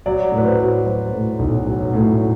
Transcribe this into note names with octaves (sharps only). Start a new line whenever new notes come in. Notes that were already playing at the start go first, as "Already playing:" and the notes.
F#3 D5
A2
B4
C5
F#3
F#3 C5
A2
B1
F#3
A2